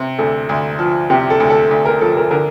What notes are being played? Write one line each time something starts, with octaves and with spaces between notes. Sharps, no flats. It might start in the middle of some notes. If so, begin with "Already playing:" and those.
Already playing: C3
D2 A4
D2
F3
C3 G4
A4
D2
A4
D2
A#4
F3 A4
A#4
D3 A#4